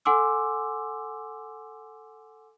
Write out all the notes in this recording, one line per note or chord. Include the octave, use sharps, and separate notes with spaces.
A4 F#5 G#5 C6 D6 E6